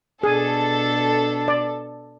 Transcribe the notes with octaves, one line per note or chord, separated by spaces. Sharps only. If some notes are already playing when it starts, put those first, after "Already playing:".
B2 D4 G#4 A4
D5